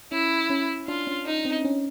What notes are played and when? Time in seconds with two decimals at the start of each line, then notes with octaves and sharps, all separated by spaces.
0.12 C#4 E4
0.50 C#4
0.87 D4 F4
1.07 C#4
1.26 D#4
1.45 C4
1.65 C#4